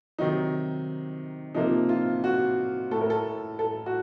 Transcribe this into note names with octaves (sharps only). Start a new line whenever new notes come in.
C3 D#3 F#3 D#4
C3 F3 A#3 D#4
F4
F#4
A2 A3 A4
A#4
A4
A4
F#4